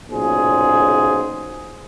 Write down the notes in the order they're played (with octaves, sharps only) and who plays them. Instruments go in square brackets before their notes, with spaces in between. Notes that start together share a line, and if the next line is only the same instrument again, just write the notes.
[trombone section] B1 A#2 C#3 G#4 C5